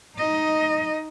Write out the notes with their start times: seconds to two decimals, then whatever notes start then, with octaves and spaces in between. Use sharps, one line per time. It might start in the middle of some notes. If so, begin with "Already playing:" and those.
0.17 D#4 D#5